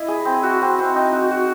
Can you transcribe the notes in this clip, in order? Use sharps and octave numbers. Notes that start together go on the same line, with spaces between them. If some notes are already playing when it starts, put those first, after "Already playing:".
Already playing: E4 D#5
G#4
C4
F#4
C4
C4
D#4
F#4
F#4